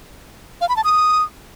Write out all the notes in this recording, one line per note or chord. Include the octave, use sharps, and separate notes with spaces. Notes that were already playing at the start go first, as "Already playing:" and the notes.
F5
B5
A5
D#6